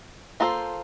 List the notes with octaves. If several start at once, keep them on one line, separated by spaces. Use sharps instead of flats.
A#3 F4 A4 C5